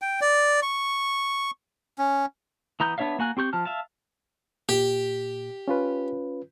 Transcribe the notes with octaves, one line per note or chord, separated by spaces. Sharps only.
G5
D5
C#6
C#4
E3 B3 A#5 D#6 G6
B3 D4 C#5 E5 F5
A#3 F#4 G#5 F#6
C4 G4 C#6 G6
F3 A5 F6
E5 F5 A5
A#2 G4
C#4 F4 B4